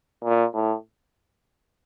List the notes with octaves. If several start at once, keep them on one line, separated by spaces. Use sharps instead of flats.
A#2
A2